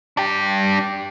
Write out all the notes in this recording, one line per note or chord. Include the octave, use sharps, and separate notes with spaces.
D4 G4